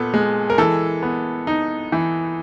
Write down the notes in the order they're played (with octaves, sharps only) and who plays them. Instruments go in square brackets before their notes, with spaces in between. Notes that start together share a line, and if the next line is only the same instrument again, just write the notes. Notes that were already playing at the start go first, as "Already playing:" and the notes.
Already playing: [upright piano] A#2 B3 A4
G#3
A#4
E3 A4
B3
D#4
E3